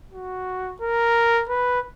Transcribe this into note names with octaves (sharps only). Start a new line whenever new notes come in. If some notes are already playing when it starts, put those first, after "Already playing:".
F#4
A#4
B4